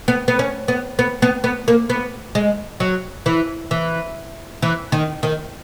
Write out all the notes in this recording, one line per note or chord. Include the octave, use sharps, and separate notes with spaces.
B3
B3
C#4
B3
B3
B3
B3
A#3
B3
G#3
F#3
E3
E3
E3
D#3
D#3